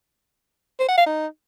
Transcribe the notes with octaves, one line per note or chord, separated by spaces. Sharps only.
C5
F#5
F5
D#4